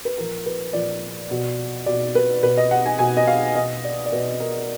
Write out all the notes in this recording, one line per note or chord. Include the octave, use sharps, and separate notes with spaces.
B4
A#2 F3 A#4
B4
A#2 F3 D5
B2
B2 D5
B4
B2 B4
D#5
F#5
G#5
B2 G#5
D#5
F5
B2 D#5
D5
D5
B2 B4
A#4